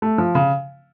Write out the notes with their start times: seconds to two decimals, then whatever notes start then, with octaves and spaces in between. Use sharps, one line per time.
0.02 A3
0.18 F3
0.35 C#3